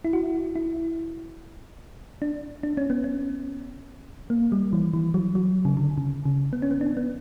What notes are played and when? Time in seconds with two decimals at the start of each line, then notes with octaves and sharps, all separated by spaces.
0.05 E4
0.13 F#4
0.56 E4
2.22 D4
2.63 D4
2.77 C#4
2.90 B3
3.04 C#4
4.30 A#3
4.52 G3
4.73 E3
4.94 E3
5.14 F#3
5.35 F#3
5.65 C#3
5.77 D3
5.98 C#3
6.25 C#3
6.53 B3
6.62 C#4
6.71 B3
6.81 D4
6.97 B3